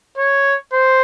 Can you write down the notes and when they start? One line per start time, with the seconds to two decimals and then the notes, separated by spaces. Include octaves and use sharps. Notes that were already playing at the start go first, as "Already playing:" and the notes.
0.18 C#5
0.73 C5